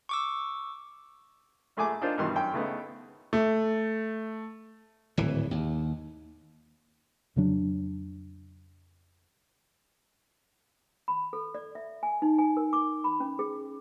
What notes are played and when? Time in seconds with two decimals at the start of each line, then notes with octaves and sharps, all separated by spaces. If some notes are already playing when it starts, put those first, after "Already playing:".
0.09 C#6 D6 E6
1.77 A#1 A3 G#4 G#5 D6
2.02 D4 D#4 F4 A#4 C5
2.18 G2 B2 D#3 E3 G3 C6
2.35 F#2 G5
2.53 C#3 A3 B3 D#4
3.33 A3
5.17 D1 G#1 E3
5.51 D#2
7.36 F2 C#3 F#3 D4
11.08 B5
11.33 A4
11.55 D5
11.75 E5
12.03 G#5
12.22 D#4
12.38 G#5
12.57 A#4
12.73 D6
13.04 B5
13.20 C#4
13.39 G#4